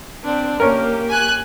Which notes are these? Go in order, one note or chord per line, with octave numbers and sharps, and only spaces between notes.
C4 D4
A#3 C#4 G4 A#4
G#5 F#6